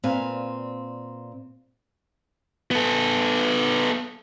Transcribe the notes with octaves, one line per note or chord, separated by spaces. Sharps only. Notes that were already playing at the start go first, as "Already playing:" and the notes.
A#2 C4 B4 D5 F5 G#5
B3 A4